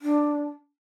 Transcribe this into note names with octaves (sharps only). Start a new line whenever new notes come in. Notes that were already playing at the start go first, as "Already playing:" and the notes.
D4